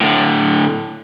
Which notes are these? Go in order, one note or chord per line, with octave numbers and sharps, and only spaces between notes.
A2 D3